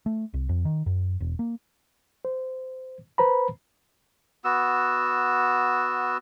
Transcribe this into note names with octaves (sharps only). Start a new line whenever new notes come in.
A3
C2
F2
D#3
F#2
E1
A#3
C5
B4 C5 A#5 B5
B3 F#4 E6